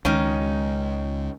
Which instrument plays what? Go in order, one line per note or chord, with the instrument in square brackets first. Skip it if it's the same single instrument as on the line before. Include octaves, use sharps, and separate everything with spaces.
[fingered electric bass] C#2 G#3 [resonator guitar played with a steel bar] D#3 C#4 D#4